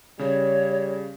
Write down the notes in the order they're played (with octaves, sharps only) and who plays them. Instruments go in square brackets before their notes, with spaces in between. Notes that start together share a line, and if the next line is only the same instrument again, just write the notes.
[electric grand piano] C#3 [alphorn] G3 [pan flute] C#5